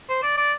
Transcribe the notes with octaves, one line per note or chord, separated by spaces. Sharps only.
C5
D5
D5